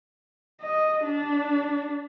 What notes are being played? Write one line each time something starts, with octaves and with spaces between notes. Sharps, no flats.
D#5
D4